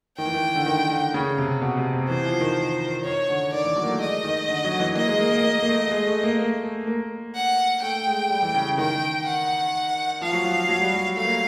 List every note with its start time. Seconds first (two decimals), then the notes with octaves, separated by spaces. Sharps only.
0.18 D#3 G5
0.26 E3
0.34 D#3
0.55 D3
0.66 D#3
0.90 D3
1.14 C#3
1.38 C3
1.61 B2
1.77 C3
1.93 C3
2.09 E3 C5
2.26 F3
2.41 D#3
3.05 D#3 C#5
3.29 D3
3.53 D#3 D5
3.65 E3
3.76 F#3
3.83 A#3
3.89 A3
4.01 G#3 D#5
4.24 D#3
4.49 D3
4.64 F#3
4.80 E3
4.96 A#3 D#5
5.08 G#3
5.20 A#3
5.32 A#3
5.44 A#3
5.62 A#3
5.68 A3
5.91 G#3
6.07 A3
6.23 A#3
6.39 A#3
6.63 A3
6.87 A#3
7.35 F#5
7.83 A3 G5
8.07 G#3
8.30 G3
8.43 E3
8.54 C#3
8.66 C#3
8.78 D#3 G5
9.26 F#5
10.22 F3 F5
10.33 F#3
10.45 F3
10.69 F#3
10.81 G3
10.94 F#3
11.17 A3 F5
11.25 A#3